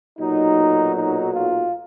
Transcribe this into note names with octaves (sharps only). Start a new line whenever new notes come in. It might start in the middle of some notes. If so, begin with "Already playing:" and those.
B1 A#2 F#3 D#4
D#4
F4